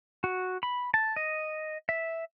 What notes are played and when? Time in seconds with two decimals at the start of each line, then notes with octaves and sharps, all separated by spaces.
0.24 F#4
0.63 B5
0.94 A5
1.16 D#5
1.89 E5